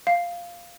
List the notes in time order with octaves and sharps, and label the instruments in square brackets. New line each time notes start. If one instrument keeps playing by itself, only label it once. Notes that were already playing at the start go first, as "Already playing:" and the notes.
[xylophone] F5